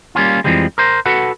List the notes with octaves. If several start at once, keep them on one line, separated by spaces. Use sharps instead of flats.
G3 A#3 C#4 F4
F2 G#2 E3 F3 G3 G#3
A#4 C5
F#4 A4 B4 F#5